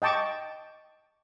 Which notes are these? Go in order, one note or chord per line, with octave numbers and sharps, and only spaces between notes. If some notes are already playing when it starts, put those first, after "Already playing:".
D#5 G5 A5 C#6 D6